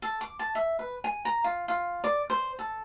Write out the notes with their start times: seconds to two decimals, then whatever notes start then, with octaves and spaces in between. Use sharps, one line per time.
0.02 A4
0.21 D6
0.39 A5
0.55 E5
0.79 B4
1.04 G#5
1.25 A#5
1.44 F4
1.68 F4
2.04 D5
2.30 C5
2.59 A4